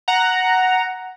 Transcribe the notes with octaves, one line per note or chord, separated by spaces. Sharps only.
F#5 A#5